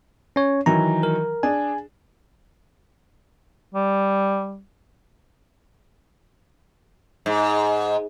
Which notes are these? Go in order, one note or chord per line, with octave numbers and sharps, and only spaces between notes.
C#4 C#5
D#3 E3 F#3 A#5
A#4
D4 G#4 G#5
G3
G#2